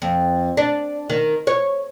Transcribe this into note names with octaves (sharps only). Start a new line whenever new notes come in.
F2
D4
D#3
C#5